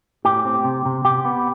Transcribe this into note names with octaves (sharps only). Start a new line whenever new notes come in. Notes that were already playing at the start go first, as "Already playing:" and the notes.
A2 G4
C4
C3
C3
C3 G4
B3